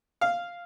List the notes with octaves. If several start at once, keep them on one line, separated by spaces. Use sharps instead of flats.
F5